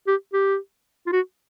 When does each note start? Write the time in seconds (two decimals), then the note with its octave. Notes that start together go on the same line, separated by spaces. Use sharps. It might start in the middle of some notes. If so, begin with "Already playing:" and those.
0.07 G4
0.33 G4
1.06 F4
1.12 F#4